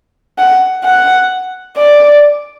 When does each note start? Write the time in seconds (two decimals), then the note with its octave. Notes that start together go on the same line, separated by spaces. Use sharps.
0.38 F#5
0.84 F#5
1.77 D5